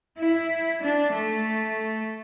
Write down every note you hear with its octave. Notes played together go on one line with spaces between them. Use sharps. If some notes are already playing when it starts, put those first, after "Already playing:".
E4
D4
A3